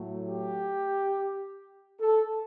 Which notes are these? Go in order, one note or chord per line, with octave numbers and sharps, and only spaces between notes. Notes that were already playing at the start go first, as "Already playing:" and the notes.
Already playing: A2 F#3 A3
G4
A4